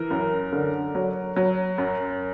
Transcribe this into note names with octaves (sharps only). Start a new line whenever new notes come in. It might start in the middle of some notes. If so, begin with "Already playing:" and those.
Already playing: E3 A#4
F#2
D3
F#3
F#3
F#2